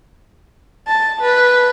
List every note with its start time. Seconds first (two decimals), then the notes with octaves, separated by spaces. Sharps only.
0.88 A5
1.22 B4